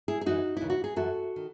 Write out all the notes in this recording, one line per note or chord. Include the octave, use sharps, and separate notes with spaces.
E4 G#4
G#4
F#2 E3 D#4 F#4
D#2 C#3 E3 E4
F#4
G#4
F#2 E3 F#4 A4
D#3